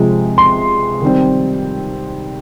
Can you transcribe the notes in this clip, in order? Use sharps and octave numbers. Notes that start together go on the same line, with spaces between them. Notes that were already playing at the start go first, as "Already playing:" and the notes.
Already playing: C3 F3 G#3
C6
D#3 G3 C4